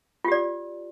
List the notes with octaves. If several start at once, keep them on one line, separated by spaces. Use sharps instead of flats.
F4 G4 D5